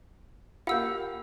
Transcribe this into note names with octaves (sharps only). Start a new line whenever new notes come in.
A#3 F4 G4 F5 F#5 E6 G6